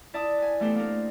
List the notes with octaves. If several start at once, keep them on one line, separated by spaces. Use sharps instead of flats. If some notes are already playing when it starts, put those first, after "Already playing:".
E4 D5 E5 A5 D#6
B4 G#5
E3 A3 B3 G4 A4 C5
A#3 D4 A#4